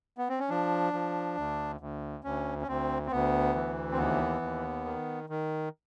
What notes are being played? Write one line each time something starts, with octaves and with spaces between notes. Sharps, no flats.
B3
C4
C#4
F3 D4
F3
D2
D2
D2 C#4
C#4
D2 C4
C4
D2 B3
E3
C4
D#2 B3
D#2
D#3
D#3